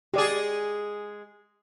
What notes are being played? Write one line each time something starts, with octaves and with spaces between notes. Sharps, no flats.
G#3 G4 G#4 D5